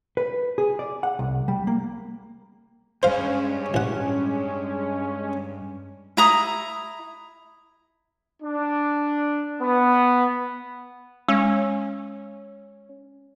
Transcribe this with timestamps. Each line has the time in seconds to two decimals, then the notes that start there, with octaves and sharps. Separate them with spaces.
0.17 B4
0.58 G#4
0.79 D5
1.03 F#5
1.19 C2
1.48 G3
1.67 A#3
3.03 G2 G#3 C#4 C5 F5
3.74 A1 F#5
6.17 E4 A#5 D#6
8.41 D4
9.61 B3
11.28 G#3 C#4